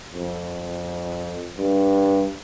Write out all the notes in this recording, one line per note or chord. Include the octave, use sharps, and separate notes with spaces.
F2
G2